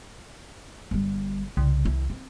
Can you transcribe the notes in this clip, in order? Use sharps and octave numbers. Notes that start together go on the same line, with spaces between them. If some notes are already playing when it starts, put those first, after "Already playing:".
G1 G3
C2 C#3
D#3 E4
C4